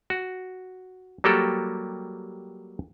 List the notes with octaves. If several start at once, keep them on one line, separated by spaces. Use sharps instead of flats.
F#4
F#3 G3 A#3 F#4 G4 A4